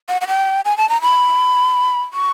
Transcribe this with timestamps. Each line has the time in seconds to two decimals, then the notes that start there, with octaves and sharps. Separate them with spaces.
0.09 F#5
0.21 F#5
0.28 G5
0.65 G#5
0.78 A5
0.89 A#5
1.02 B5
2.13 C#6